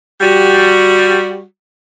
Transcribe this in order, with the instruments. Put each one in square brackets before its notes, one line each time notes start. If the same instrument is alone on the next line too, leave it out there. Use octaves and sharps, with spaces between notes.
[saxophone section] G3 F#4